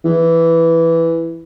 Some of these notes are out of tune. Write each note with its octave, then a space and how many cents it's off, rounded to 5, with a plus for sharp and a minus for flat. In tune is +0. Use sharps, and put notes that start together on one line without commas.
E3 +5